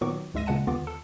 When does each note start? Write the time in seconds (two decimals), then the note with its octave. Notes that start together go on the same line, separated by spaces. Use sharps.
0.01 A#2 D#3 F#3 B3 C#6 D6
0.34 D2 G#2 G#3 E5 A#6 D#7
0.46 A#2 C#3 G#3 F#5 A5 D#7
0.67 D#2 D3 B3 F4 D6
0.87 A4